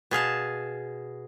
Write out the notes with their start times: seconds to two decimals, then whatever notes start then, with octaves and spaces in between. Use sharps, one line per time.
0.11 B2 G#4 F5 A5